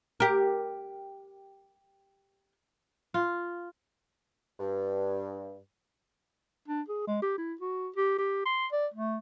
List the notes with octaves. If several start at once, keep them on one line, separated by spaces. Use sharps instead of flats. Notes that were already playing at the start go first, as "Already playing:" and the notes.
G4 A#4
F4
G2
D4
G#4
G#3
G4
E4
F#4
G4
G4
C6
D5
A3